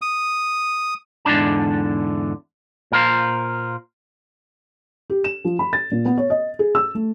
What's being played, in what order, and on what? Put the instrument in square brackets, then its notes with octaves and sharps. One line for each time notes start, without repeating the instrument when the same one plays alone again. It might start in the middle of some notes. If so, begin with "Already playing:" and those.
[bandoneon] D#6
[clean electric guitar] E2 G#2 D3 D4 A5
A#2 A#4 C5
[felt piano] G4
E7
F3
B5
A6
A#2
B3
C#5
D#5
G#4
E6
A3